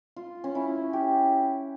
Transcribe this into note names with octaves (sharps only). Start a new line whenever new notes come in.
F4
C#4
E4
G4